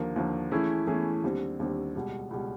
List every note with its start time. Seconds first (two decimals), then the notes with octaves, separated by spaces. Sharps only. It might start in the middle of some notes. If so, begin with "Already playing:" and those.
Already playing: D#2 D3 F3 A#3
0.16 D#2 D3 F3 A#3
0.51 E3 A3 C#4 E4 G#4
0.87 E3 A3 C#4 E4 G#4
1.24 D#2 D3 G3 C4
1.59 D#2 D3 G3 C4
1.95 C#2 B2 G3
2.31 C#2 B2 G3